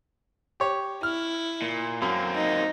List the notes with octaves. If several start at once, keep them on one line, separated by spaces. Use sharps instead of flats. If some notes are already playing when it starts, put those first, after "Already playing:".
G4 C#5
E4 F6
A#2
F#2 A#3 C4
D#4